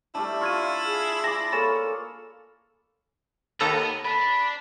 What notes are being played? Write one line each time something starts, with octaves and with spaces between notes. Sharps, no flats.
G3 A3 D4 E4 A5
F4 F5 C#6 G#6 D#7
G#4
A5 D6 A#6
A#3 G#4 A4 C#5 B5 A6 E7
D#2 B3 A4 A#5
D5 A5 B5